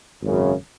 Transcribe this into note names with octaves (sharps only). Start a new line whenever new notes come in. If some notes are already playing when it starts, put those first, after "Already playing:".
G#1 F#2 C#3